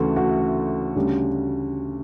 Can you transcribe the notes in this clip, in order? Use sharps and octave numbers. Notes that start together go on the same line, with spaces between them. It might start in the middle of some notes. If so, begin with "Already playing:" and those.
Already playing: D2 C#3 E3 A3 F#4
F#4
D2 C#3 G3